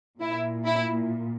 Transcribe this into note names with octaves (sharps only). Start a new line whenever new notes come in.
A#2 E4
E4